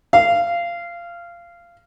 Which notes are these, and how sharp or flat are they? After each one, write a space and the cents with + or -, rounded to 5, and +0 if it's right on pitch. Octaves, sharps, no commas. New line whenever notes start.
F5 -20